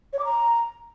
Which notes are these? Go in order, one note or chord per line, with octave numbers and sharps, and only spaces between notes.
C#5
D6
A#5